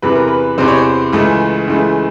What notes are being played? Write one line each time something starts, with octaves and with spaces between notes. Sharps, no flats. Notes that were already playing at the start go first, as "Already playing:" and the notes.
E2 C3 E3 B4
A#4
B4
E2 C3 E3 C5
C#5
C5
C#2 C#3 E3 A3
C#2 C#3 E3 A3